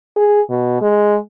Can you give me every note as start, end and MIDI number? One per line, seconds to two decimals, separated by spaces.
0.16 0.41 68
0.49 0.78 47
0.81 1.17 56